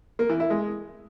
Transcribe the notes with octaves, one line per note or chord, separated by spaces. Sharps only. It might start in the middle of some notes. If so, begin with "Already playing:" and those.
A#3
E3
E4
G#3